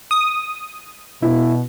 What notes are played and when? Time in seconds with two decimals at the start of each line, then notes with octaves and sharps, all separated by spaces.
0.11 D#6
1.22 B2 E4